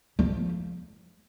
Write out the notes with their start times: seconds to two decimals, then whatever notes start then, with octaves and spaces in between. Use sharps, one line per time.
0.19 F3